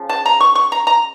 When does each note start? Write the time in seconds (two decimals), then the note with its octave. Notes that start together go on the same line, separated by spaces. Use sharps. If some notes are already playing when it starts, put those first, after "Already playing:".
Already playing: C#3 F3
0.09 A5
0.26 A#5
0.40 C#6
0.55 C#6
0.72 A#5
0.87 A#5